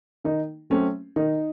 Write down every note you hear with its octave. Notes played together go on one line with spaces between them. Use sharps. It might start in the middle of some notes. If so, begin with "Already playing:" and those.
D#3 D#4
F#3 A3 C4 C#4
D#3 D#4